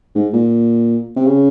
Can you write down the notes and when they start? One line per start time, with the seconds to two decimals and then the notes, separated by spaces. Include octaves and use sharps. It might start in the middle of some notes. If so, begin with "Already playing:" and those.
0.15 G#2
0.33 A#2
1.16 C3
1.26 C#3